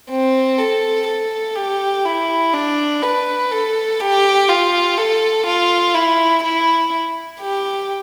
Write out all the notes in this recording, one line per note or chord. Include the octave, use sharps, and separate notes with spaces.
C4
A4
A4
G4
E4
D4
B4
A4
G4
F4
A4
F4
E4
E4
G4